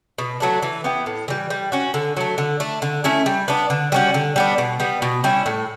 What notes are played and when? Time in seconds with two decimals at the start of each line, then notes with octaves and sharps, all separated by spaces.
0.18 B2
0.40 F#3 A3 D4
0.63 E3
0.84 B3 E4 G4
1.06 A2
1.28 E3 G3
1.50 G3
1.72 C#4 F#4
1.94 D3
2.17 F#3 A3
2.38 D3
2.60 A3 D4
2.82 D3
3.04 A3 C#4 E4
3.26 G3
3.48 B3 D4
3.70 D3
3.92 G3 C#4 F#4
4.14 D3
4.36 G3 B3 D4
4.58 B2
4.80 G3 B3
5.02 B2
5.24 G3 C#4 E4
5.46 A2